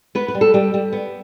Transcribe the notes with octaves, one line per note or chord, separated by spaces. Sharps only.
B3 B4
B4
G3
A4
G3 G4
G3
B3